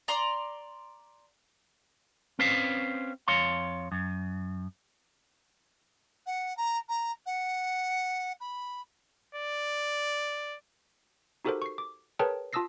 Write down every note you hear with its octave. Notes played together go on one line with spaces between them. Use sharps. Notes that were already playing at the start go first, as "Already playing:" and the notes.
D5 A#5 C6
C4 C#4 B4 C5 F5
F2 C#5 F5 C6
F#2
F#5
A#5
A#5
F#5
B5
D5
D#4 F#4 G4 A4 A#4 C5
C#6 C7
D6
G#4 A#4 B4 C#5 G5 A5
F4 A5 D#6 E6 A#6 C7